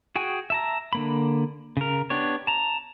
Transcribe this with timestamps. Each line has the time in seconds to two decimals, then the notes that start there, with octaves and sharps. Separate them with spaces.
0.16 F#4 G#4 G5 G#5
0.50 E5 A5 A#5
0.93 D3 A#3 B5
1.77 C#3 A#4
2.10 B3 D4 G4 C#5
2.47 A5 A#5